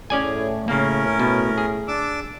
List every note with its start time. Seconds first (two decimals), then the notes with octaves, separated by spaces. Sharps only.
0.10 A2 C#4 G#4 D5 G#5
0.68 C#3 A#3 C#4 A#4
1.19 B2
1.58 G#4
1.88 D4 D6 E6